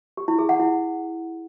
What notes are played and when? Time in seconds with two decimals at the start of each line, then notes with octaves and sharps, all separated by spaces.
0.17 G4
0.28 E4
0.39 G#4
0.49 F#5
0.60 E4